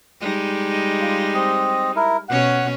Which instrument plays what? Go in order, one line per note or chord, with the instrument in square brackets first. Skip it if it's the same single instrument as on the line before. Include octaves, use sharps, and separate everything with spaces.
[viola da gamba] G3 G#3 D#4
[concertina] F4
C4 D#5
E4 A#4
[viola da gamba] B2 C#4 C#5 [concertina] F#5